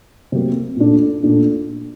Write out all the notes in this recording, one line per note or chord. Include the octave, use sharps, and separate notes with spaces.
C3 F#3 A#3
A#2 A3 D4
A#2 A3 D4